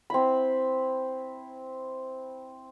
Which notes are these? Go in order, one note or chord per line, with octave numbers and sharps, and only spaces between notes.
C4 E4 B5